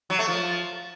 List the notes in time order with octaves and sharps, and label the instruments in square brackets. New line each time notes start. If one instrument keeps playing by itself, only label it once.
[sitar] F#3
A3
F3